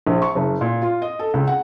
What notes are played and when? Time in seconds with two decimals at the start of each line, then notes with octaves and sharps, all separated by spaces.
0.07 A#1
0.22 C#6
0.35 F#1
0.61 A#2
0.82 F4
1.02 D#5
1.19 A4
1.34 C#2
1.47 F#5